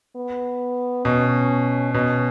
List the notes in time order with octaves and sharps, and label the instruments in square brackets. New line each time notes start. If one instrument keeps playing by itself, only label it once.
[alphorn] B3
[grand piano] B2 [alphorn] C#4
[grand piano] B2 [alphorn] C#4